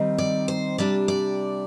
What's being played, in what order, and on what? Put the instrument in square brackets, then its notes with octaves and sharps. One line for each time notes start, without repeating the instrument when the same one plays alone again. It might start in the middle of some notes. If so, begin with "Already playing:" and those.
Already playing: [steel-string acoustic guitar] D#3 G3 C4 D#4
D5
C5
C3 G3 D4 D5
D5